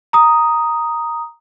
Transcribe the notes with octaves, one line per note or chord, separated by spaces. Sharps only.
A#5 D#6